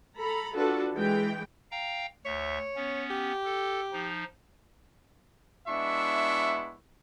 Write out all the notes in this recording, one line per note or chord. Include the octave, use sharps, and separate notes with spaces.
A4 A#5 B5
D4 F4 F#4 A4 B4
E3 G#3 G5
F5 G5 A#5
D2 C#5 E5
B3 C#4
G4
A4
F3 D#4
G#3 B3 D4 E4 E5 C#6